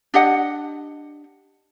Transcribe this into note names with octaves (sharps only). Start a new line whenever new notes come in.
D4 G4 D#5 F#5